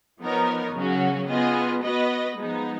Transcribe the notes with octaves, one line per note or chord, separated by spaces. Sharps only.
F3 B3 D#4 A#4 C#5
C#3 F#3 C#4 F#4
B3 F4 G#4 D#5
B3 F#4 B4 D#5
F3 G#3 B3 D#4